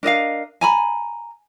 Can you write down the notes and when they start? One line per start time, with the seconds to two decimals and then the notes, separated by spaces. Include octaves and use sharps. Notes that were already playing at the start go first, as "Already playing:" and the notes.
0.03 D4 A#4 D#5 F5
0.61 G#5 A#5 B5